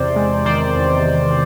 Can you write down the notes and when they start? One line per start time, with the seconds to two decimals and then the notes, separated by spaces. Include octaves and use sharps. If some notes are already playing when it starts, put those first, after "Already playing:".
Already playing: E2 C3 C5 D5
0.16 G#3
0.45 D#3 C5 D5
0.76 E2